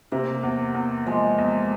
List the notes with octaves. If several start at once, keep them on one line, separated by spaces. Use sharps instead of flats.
C3 A#3
E2
E2
F3 G#3
E2